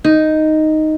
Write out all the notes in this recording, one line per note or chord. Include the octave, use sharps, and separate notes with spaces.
D#4